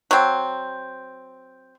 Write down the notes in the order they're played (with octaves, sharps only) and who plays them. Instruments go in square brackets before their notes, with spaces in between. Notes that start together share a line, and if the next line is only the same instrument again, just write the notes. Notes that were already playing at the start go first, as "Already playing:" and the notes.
[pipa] F#3 C4